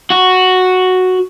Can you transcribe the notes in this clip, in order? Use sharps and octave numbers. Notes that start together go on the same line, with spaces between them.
F#4